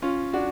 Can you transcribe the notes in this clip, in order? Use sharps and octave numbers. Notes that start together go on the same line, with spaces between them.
C#4 F4
D4 F#4